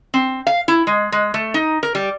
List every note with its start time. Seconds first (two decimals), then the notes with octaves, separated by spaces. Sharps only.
0.14 C4
0.47 F5
0.68 E4
0.87 G#3
1.12 G#3
1.34 A3
1.54 D#4
1.83 A#4
1.95 G3